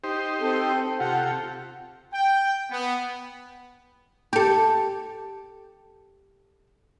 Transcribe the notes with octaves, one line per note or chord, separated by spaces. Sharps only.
D#4 G4 C5
C4 A4
C3 F4 G4 A4 F#5
G5
B3
G4 A4